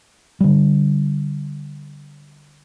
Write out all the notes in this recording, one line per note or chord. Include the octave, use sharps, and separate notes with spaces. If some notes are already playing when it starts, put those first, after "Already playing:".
D3 G3